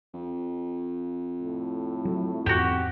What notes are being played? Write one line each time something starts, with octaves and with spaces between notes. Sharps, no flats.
F2
A2
F#3
E2 G#2 C4 F#4 G4